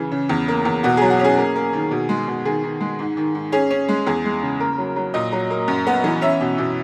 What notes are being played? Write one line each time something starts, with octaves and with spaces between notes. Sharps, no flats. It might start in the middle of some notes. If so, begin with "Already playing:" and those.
Already playing: C#3 E3 G#4
C#3
E2
A#3
E2
B2 F#4
F#3 G#4
F#4
C#4 G#4
A#3
A#3
D#3
B2
G#3
B2
D#3 G#4
D#3
G#3
G#2
D#3
G#2
C#4 G#4
C#4
G#3
E2 G#4
G#3
C#3
A#3 A#4
F#3
F#3
A#2 D#5
F#3
A#3
F#2
B3
E3
C#4 E5
B2
B2